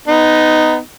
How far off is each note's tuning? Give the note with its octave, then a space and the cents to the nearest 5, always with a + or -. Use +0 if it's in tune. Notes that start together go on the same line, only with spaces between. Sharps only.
B3 +20 D#4 +0